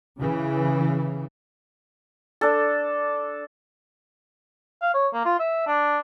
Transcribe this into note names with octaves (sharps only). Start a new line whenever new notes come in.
C#3 E3
D4 A4
F5
C#5
A#3
F4
E5
D4